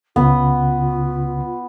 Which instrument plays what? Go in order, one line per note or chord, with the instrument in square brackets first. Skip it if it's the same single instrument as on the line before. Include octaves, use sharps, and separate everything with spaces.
[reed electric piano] C#2 C#3 [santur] B3 [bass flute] F4